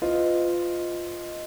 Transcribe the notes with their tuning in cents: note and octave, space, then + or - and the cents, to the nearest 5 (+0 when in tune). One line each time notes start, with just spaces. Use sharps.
F4 +0 B4 +45 D#5 +0